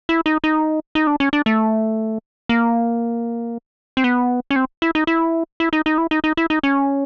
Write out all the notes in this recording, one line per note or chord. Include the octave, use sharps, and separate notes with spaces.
E4
D#4
D#4
D#4
D4
C#4
D4
A3
A#3
C4
B3
C#4
C4
E4
D#4
E4
E4
D#4
D#4
E4
D#4
D#4
E4
D#4
C#4